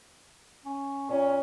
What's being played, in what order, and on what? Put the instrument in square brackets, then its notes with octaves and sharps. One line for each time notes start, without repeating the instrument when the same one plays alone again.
[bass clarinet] C#4
[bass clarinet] A#2 [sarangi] C#4